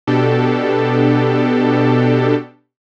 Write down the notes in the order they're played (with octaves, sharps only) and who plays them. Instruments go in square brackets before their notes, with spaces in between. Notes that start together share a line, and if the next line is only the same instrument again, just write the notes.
[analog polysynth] B2 D4 G4 A4